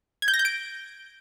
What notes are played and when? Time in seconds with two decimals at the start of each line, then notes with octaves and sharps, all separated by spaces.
0.22 G#6
0.28 G6
0.34 A#6
0.39 G6
0.45 D7